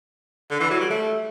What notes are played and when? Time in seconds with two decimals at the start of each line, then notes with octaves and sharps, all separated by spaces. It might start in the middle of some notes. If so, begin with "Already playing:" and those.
0.50 D3
0.60 E3
0.71 F#3
0.81 G3
0.90 A3